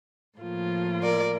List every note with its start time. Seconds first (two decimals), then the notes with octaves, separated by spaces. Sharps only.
0.37 A2 F3 A#3 F4
1.02 A#4 D5